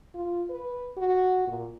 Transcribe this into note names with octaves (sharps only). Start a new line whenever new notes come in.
F4
B4
F#4
A#2